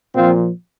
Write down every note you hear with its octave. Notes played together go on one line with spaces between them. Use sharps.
A#2 F3 C4 F4